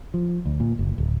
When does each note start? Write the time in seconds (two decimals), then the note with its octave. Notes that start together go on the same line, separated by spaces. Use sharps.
0.14 F3
0.46 D2
0.60 A#2
0.79 F#1
0.98 D1